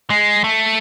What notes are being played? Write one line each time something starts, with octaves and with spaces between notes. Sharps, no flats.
G#3
A3